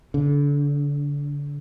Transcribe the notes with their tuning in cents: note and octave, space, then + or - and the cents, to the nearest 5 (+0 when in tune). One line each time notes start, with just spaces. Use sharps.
D3 -30